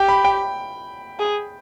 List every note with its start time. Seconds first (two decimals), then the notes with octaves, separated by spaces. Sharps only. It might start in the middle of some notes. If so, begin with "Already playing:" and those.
Already playing: G4 G5
0.09 B5
0.25 G5
1.19 G#4